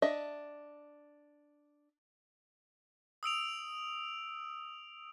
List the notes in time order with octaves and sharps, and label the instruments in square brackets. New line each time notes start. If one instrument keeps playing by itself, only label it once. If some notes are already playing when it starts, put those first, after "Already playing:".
[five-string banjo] D4 D#5 E5
[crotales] D#6 E6 D7 F7